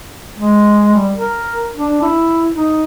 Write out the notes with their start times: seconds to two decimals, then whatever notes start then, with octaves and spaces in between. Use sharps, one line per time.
0.38 G#3
0.94 G3
1.16 A#4
1.76 D4
2.02 E4
2.54 D#4